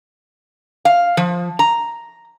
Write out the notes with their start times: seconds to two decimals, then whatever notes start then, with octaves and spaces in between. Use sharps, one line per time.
0.85 F5
1.17 F3
1.59 A#5